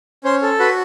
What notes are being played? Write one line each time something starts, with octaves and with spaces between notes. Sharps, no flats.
C#4 C5
A4
F#4 B4